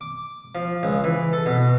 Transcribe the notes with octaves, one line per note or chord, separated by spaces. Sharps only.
D6
F3
C#2
E3
A4
B2